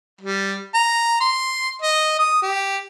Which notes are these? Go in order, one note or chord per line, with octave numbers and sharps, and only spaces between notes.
G3
A#5
C6
D#5
D#6
G4